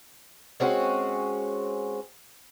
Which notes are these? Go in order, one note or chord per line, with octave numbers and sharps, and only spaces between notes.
G#3 C4 C#4 F#4